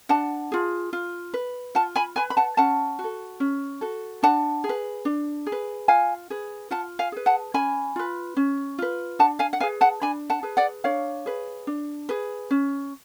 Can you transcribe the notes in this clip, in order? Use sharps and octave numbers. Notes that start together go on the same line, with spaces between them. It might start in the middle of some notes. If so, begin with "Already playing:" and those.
D4 F#5 A5
F4 G#4
F4
B4
F4 F#5 A5
G#5 B5
B4 G#5 B5
B5
F#5 A5
C#4 F#5 A5
F#4
A4
C#4
F#4 A4
D4 F#5 A5
G#4
B4
D4
G#4
B4
F4 F5 G#5
G#4 B4
F4 F#5 A5
F5 G#5
G#4 B4
F#5 A5
C#4 G#5 B5
F4 B4
C#4
F4 B4
D4 F#5 A5
F5 G#5
F#5
G#4 B4 F5 G#5
F#5 A5
D4 G#5 B5
F#5 A5
G#4 B4
D5 F#5
D4 C#5 F5
G#4 B4
D4
G#4 B4
C#4